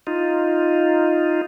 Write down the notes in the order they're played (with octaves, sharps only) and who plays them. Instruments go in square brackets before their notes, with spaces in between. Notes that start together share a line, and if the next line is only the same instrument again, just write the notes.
[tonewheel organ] D#4 F4